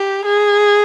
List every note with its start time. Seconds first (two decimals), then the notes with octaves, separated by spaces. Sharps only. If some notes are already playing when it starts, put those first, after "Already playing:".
Already playing: G4
0.25 G#4